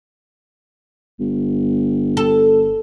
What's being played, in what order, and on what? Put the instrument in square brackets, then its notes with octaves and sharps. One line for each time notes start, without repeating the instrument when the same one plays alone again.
[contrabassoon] G1
[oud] A4